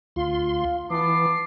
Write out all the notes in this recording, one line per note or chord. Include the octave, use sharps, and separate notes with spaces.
D2 F4 C6
E3 B3 A5 D6 C7